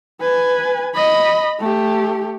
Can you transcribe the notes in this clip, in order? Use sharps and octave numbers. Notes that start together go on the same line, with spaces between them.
B4 G#5
D#5 B5
A3 G4